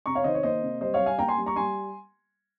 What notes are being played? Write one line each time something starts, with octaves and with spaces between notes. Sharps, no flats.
C3 A#5 C#6
C#5 F5
D#3 C5 D#5
C#5
A#3 C5 D#5
C3
G3 C5 D#5
C#5 F5
G3
F5 G#5
A#3 G5 A#5
G#5 C6
G3
A#5 C#6
G3 G#5 C6